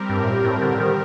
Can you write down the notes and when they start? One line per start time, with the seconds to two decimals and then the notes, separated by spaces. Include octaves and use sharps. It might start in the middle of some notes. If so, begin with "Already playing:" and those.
Already playing: G3 C4 G4 A#4
0.09 G2
0.20 A2
0.27 A#2
0.44 A2
0.62 D3
0.80 D#3